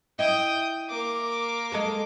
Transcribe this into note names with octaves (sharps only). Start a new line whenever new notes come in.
E4 D#5 G5 D#6
A#3 D6
G#3 A4 A#4